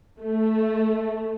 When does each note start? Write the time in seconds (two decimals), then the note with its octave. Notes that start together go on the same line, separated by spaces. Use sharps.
0.20 A3